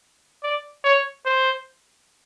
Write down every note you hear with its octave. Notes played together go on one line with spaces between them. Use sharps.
D5
C#5
C5